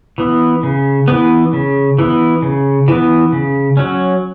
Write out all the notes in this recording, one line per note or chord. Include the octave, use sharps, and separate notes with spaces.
E3 B3
C#3
E3 B3
C#3
E3 B3
C#3
E3 B3
C#3
F#3 C#4